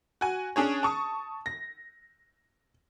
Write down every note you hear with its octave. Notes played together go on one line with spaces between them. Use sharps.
F#4 G#5
C#4 D4 G#4 C#5
A5 C#6 D#6
A#6